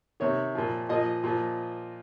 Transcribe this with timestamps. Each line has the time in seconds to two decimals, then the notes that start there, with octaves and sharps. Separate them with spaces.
0.20 C3 D#3 C#5
0.55 A#2 F3
0.89 A#2 F3 D#5
1.24 A#2 F3